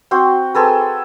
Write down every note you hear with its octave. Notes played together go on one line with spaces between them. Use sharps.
C4 F#4 C5
C4 G#4 A4 B4